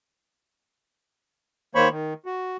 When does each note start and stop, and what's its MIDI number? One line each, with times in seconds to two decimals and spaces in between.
1.75 1.89 51
1.75 1.89 58
1.75 1.89 72
1.75 1.89 73
1.75 1.89 83
1.75 1.89 85
1.90 2.13 51
2.26 2.57 66